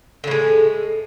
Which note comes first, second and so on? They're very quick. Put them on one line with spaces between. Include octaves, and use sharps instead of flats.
D3 A2 G#3